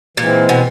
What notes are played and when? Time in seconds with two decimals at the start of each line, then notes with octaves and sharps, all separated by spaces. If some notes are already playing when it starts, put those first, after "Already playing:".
0.17 A#2 E3 G#3 C4
0.49 B2